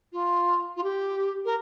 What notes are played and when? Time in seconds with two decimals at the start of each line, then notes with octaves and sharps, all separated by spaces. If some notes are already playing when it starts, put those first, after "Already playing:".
0.13 F4
0.77 F4
0.84 G4
1.45 A#4